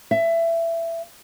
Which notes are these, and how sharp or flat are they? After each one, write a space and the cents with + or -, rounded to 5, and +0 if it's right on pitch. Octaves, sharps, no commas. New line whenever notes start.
E5 +20